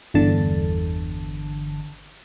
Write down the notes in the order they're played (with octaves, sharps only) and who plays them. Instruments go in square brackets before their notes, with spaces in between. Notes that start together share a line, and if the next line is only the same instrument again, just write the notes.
[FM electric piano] G1 E2 D3 A5